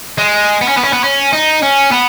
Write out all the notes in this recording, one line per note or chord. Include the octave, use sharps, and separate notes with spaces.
G#3
B3
C#4
B3
C#4
B3
C#4
D#4
C#4
B3